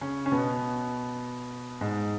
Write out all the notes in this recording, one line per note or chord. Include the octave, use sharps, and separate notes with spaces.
C#3 C#4
C#4
B2 B3
G#2 G#3